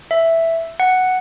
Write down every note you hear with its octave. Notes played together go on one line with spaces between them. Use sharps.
E5
F#5